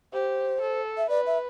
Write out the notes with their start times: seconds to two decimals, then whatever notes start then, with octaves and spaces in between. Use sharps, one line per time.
0.13 G4 C5
0.61 A4
0.97 E5
1.09 B4 D5
1.27 E5